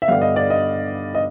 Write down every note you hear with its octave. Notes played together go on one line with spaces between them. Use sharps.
E5
G2 D3 G3 B3 F5
D#5
D5
D#5
D#5